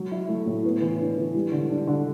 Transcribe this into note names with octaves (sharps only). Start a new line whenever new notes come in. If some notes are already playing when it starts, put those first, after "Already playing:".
Already playing: F#3
E4
A3
A2
B3
E3
D4
E3
G3
D3
D4
D3